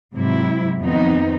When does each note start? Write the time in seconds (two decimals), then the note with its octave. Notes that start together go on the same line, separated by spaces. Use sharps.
0.14 G#2 C3 F#3 E4
0.81 F2 D#3 B3 C4 D#4